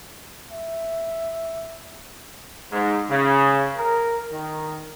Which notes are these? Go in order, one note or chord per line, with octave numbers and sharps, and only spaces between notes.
E5
G#2
C#3
A#4
D#3